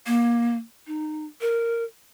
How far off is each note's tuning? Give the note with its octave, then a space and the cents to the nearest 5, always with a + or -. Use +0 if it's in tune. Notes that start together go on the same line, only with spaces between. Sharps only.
A#3 +20
D#4 -20
A#4 -10